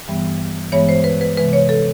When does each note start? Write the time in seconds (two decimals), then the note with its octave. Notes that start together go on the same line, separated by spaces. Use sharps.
0.08 G2 E3 G3 B3
0.72 G2 E3 G#3 B3 C#5
0.89 C5
1.04 B4
1.21 B4
1.37 C3 E3 G#3 B4
1.53 C#5
1.69 A4